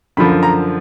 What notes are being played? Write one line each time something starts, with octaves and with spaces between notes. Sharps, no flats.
F#2 D3 F3 B5
A#5